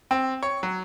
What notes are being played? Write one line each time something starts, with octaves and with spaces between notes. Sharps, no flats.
C4
C#5
F#3